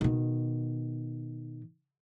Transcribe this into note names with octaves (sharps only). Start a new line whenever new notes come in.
B2 D#3